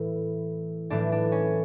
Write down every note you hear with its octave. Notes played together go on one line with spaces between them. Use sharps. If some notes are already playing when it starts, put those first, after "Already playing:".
Already playing: A2 E3 E4
A2 E3 D4
D4
C#4